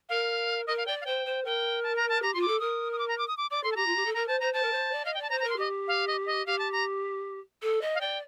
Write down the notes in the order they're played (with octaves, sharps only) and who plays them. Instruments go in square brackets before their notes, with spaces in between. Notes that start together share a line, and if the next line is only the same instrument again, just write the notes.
[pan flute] A#4 [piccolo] F5
[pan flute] A#4 [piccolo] D#5
[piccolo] F5
[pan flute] D5 [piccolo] G5
[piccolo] F5
[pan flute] C5 [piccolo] G5
[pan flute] C5
[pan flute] A#4 [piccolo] G5
[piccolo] A5
A#5
A5
[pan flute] G4 [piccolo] A#5
[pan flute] F4 [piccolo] C6
[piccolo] D6
[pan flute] A4
[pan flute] A#4 [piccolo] D#6
[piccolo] D#6
D6
A#5
D6
D#6
D6
[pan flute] D5 [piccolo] D6
[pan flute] A4 [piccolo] C6
[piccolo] A5
[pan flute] G4 [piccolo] A#5
[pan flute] F4
G4
A4
[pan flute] A#4 [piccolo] A#5
[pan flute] C5 [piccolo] A5
[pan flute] C5 [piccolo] A#5
[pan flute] C5 [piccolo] A5
[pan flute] A#4
C5
D5
[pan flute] D#5 [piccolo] F5
[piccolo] G5
[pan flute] D5 [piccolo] A5
[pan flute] C5 [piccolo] A#5
[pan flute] A#4 [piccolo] A#5
[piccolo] C6
[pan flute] G4 [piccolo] D#5
[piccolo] F5
D#5
D#5
[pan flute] G4 [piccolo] F5
[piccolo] A5
A#5
[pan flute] A4
D#5
[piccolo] F5
[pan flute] D5 [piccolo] G5